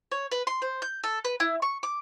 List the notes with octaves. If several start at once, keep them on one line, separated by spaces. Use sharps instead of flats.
C#5
B4
C6
C5
G6
A4
B4
E4
C#6
D6